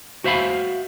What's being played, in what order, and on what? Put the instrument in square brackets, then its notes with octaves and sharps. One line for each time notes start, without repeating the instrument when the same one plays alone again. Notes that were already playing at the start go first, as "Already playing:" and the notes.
[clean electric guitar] F#4 C5 E5 F5 B5